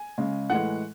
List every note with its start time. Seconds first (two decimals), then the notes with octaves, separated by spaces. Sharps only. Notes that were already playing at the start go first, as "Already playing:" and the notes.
Already playing: G#5
0.18 C#3 G#3
0.50 A2 E3 G#3 F#5